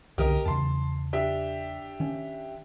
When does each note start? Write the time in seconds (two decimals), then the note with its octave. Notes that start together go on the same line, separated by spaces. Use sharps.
0.18 C2 D3 D#3 G4 A#4 D#5
0.45 E2 C#3 A5 C6
1.13 D4 G4 E5
2.00 D#3 C#4